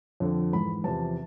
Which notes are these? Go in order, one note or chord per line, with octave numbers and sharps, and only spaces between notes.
F2 D3 F3
G#2 E3 B5
E2 C3 F3 A5